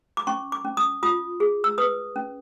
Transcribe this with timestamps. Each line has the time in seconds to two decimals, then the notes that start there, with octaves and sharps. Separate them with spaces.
0.17 D6
0.27 C#4 C#6
0.52 D6
0.65 C#4
0.77 D#6
1.03 F4 D#6
1.40 G#4
1.64 E6
1.78 B4 D#6
2.16 C#4